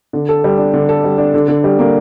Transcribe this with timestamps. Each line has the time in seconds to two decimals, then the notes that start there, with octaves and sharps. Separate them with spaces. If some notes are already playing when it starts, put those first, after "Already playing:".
0.13 D3
0.29 A4
0.44 G3
0.58 D4
0.74 D3
0.89 A4
1.04 G3
1.18 D4
1.34 D3
1.48 D3
1.64 G3
1.79 A#3